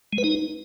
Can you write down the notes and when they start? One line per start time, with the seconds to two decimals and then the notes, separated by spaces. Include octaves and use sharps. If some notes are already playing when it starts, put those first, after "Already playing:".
0.13 G#3
0.18 B4
0.24 D#4